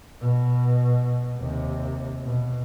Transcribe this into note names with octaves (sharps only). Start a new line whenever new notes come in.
B2
D#2 C3
B2